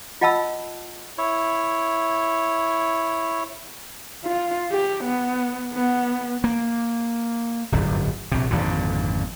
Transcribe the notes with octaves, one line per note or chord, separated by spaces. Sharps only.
F4 D#5 F#5 A5 B5 E6
E4 C#5
F4
G4
B3
B3
A#3
D1 G1 F#2
A#1 C3
G#1 F2 A#2 D3